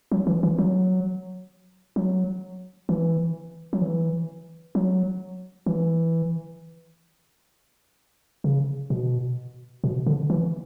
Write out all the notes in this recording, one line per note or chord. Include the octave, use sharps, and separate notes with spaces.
F#3
E3
E3
F#3
F#3
E3
F#3
E3
F#3
E3
C#3
B2
B2
D3
E3